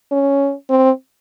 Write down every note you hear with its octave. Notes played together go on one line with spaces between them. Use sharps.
C#4
C4